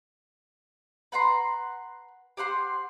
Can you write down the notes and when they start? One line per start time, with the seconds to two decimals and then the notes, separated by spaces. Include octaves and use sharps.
1.12 B4 F#5 A#5 C6
2.37 G4 C5 F#5 C6